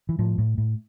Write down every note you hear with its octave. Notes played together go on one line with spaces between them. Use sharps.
E3
A2 F3
A2
A2